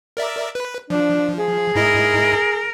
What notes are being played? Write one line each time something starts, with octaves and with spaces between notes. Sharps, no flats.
A#4 D5 E5
B4
F3 D4
G#4
G#2 E4 A#4 D#5